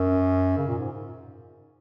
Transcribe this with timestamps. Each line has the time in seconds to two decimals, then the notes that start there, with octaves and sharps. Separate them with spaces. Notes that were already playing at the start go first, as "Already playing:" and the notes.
Already playing: F#2
0.58 C#3
0.68 A#2
0.78 G#2